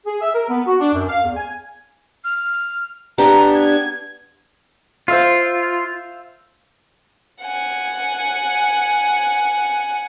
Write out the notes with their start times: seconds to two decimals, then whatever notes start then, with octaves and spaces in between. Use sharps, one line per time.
0.06 G#4
0.22 E5
0.35 A#4
0.49 B3
0.67 F#4
0.80 D4
0.94 F#2
1.09 F5
1.25 E2
1.37 G#5
2.24 F6
3.18 B3 D4 G4 A#5
3.55 G#6
5.08 F4 C5 E5 F5
7.44 F#5 G#5